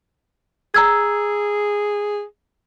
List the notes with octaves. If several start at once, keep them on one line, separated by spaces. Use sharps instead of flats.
G#4 A#5 E6 G#6